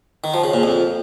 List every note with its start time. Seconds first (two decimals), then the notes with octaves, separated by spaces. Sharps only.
0.24 D#3
0.34 F3
0.44 C#3
0.53 A#2
0.63 F2